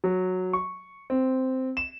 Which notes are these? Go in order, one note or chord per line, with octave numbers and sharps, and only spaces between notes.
F#3
C#6
C4
E7